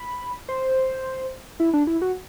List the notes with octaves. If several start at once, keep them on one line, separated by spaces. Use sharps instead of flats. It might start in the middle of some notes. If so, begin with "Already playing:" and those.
Already playing: B5
C5
E4
D4
E4
F#4